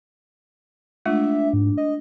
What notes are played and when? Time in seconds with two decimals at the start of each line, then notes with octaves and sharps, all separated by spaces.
1.06 G#3 A3 D4 F4 E5
1.53 G#2
1.78 D#5